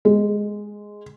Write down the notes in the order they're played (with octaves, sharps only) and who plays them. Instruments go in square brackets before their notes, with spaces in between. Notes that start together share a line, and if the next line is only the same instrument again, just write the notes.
[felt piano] G#3